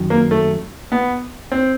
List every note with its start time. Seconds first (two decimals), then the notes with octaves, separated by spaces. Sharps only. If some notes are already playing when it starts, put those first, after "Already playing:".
Already playing: F#2 D#3 F#3
0.10 A#3
0.31 A3
0.92 B3
1.52 C4